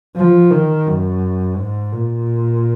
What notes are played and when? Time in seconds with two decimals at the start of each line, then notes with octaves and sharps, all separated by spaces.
0.17 F3
0.51 D#3
0.86 F#2
1.57 G#2
1.92 A#2